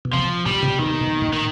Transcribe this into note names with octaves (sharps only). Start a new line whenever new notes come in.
B2
C3 F3
A#2 G3
C3
B2 D#3
B2
A#2
D#3